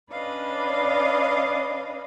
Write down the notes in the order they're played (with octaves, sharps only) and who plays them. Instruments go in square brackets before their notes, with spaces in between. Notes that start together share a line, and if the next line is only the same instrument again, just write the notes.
[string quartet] C#4 D4 B4 D#5 F5